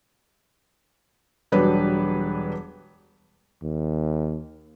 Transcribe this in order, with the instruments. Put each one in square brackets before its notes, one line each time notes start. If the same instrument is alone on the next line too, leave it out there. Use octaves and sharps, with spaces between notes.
[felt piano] E1 F#3 G3 D4 B4
[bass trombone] D#2